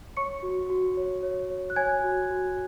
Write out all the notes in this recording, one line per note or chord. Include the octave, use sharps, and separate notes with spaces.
C#5 C#6 C#7
F#4
F#4
C#5
C#5
C#5
F#6
C#5 G#5 G#6
F#4
F#4